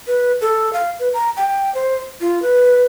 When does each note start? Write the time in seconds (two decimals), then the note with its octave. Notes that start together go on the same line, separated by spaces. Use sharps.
0.07 B4
0.41 A4
0.73 F5
1.00 B4
1.14 A#5
1.37 G5
1.75 C5
2.21 F4
2.42 B4